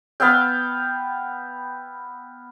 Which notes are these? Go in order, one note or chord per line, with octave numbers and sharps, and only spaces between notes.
B3 E5 F5 G5